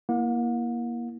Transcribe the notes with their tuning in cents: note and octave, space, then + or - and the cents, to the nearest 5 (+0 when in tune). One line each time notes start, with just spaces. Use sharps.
A#3 +20 E4 +0 F#5 -45